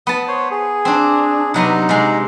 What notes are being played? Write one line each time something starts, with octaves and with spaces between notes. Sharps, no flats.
B3 A5 D#6
C5 C#5
G#4
C4 D4
C3 F#3 B3 D#4
C3 G#3